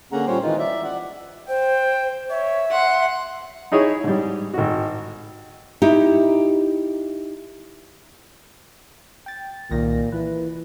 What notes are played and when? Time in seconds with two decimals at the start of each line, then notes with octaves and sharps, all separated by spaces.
0.12 D3 A#3 C#4 G#4 F#5 A#5
0.27 A#2 G3 C#4 C5 C#5 G5
0.43 D#3 E3 G#3 D#4 F4
0.58 D5 E5
0.84 D5 F#5
1.48 C5 G5
2.30 C#5 E5
2.72 F#5 C6
3.72 D#4 E4 G#4 C#5
4.04 G#2 G3
4.54 G#1 F#4
5.82 D#4 E4 G4
9.26 G5 A6
9.71 C2 A#2 D#3 A#6
10.12 E3 B4